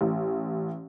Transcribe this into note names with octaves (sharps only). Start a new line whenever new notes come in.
A1